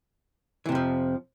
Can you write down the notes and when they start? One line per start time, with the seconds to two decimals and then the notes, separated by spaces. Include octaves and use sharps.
0.66 E3
0.69 C3
0.72 F2
0.75 F3